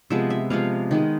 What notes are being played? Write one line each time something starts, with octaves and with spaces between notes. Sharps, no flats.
C3 F3 G#3 B3 E5
E5
C3 F3 G#3 B3 F5
D#3 G#3 B3 D#5